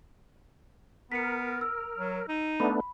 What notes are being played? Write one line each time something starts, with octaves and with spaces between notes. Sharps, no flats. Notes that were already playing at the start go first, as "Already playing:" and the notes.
B3 A#4 B6 C#7
E6
F#3
D#4
A3 B3 D4 B5